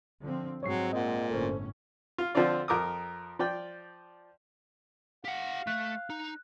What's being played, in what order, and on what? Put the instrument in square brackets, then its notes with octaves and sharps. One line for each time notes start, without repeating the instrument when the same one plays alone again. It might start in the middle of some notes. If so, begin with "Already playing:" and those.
[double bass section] D3 F3 C4
[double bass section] G#2 G#3 C4 [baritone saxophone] F#3 [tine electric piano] C#5 C#6 C7
[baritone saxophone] A#2 [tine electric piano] D#5 F#5
[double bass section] G1 A2 C#4 [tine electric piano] A4 C5
[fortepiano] F4
D3 F3 C4 D4 F4 D5
F2 A#4 D6 D#6
F3 D5 G5
[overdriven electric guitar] G4 F#5 [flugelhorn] F5
[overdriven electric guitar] A3 [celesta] F#6
[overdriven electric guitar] D#4